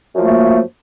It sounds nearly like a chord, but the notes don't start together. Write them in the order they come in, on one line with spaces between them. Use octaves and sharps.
F#2 F3 A3 A#3